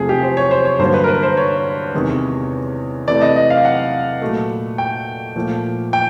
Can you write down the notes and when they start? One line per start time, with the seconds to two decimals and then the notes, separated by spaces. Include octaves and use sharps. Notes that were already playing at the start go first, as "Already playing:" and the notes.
Already playing: E2 C3 F3 A3 G#4
0.09 G4
0.23 C5
0.37 C#5
0.51 C5
0.65 C#5
0.79 G2 D3 F#3 A#3 C5
0.94 B4
1.04 A#4
1.08 B4
1.23 C5
1.37 C#5
1.94 E2 C3 D#3 G#3
3.07 C3 E3 A3 D5
3.22 D#5
3.36 D#5
3.50 F5
3.65 F#5
4.22 A#2 F#3 A3
4.78 G5
5.36 A#2 F3 A3
5.93 G5